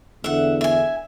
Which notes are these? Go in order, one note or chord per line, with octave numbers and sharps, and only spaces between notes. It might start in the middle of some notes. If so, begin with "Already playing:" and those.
E2 D3 E5 F#5
E5 G#5